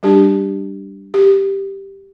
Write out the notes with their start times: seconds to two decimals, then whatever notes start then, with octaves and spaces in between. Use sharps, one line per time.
0.03 G3 D4 G4
1.14 G4